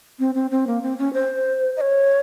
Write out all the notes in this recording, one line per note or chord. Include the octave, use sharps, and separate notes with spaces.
C4
C4
C4
A#3
C4
C#4
C5
D#5
C#5